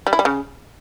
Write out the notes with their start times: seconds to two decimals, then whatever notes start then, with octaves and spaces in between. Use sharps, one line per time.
0.07 G3
0.13 E4
0.19 G3
0.25 C#3